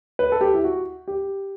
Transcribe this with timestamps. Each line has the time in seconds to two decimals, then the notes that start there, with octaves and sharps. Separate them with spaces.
0.19 B4
0.32 A4
0.41 G4
0.54 E4
0.64 F#4
1.08 G4